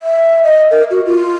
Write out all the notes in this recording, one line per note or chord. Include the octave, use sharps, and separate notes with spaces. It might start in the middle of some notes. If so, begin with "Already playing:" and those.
E5
D#5
A#4
F#4
F4